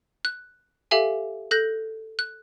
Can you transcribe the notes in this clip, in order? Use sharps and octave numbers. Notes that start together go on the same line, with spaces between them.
F#6
G4 A4 E5 F5 G#5
A4 F#6 G6 A#6
F#6